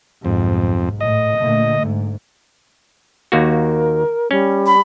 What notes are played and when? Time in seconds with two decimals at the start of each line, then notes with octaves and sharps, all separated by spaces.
0.25 B1 F2 G#2
1.00 A2 D#5
1.38 A#2 D3 A3
1.81 G#2
3.32 D#2 A#3 F#4
3.48 A#4
4.31 G3 C#4
4.66 B5